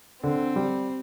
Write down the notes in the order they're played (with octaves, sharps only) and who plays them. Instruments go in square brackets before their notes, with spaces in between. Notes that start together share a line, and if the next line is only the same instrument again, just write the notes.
[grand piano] D3 [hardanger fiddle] C4
[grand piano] G3